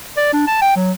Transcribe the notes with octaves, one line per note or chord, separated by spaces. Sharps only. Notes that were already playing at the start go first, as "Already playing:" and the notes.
D5
D4
A5
G5
F#3